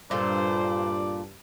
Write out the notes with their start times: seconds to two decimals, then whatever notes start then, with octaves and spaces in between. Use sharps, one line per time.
0.11 G2 A#2 F4 A4 C5 D5